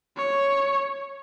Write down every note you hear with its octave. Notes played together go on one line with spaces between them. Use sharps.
C#5